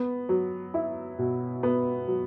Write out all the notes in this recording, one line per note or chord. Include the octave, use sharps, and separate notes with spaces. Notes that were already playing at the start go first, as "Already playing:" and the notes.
Already playing: B3
F#3
E4
B2
B3
F#3